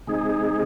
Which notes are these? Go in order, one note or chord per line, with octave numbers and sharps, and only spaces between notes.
C3 G#3 D#4 G#4